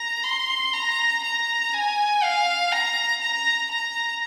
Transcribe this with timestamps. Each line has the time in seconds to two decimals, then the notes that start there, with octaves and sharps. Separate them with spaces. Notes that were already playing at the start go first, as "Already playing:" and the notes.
Already playing: A#5
0.24 C6
0.73 A#5
1.24 A#5
1.73 G#5
2.23 F5
2.72 A#5
3.21 A#5
3.71 A#5